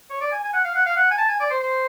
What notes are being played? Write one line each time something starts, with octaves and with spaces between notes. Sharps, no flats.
C#5
D5
G#5
G#5
F#5
F5
F#5
F5
F#5
G#5
A5
G#5
D5
C5
C5